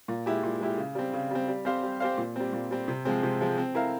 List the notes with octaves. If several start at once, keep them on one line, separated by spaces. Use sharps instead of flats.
A#2
G#3 E4 G4
A#2
G#3 E4 G4
C#3
G3 C4
C#3
G3 C4
G3
C4 G4 C5 F5
G3
C4 G4 C5 F5
A#2
G3 C4
A#2
G3 C4
C3
F3 G#3 C4
C3
F3 G#3 C4
C4
E4 A#4 F5